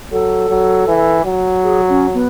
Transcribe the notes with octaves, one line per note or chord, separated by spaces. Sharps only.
F#3 A4
F#3
E3
F#3
G#4
C#4
B3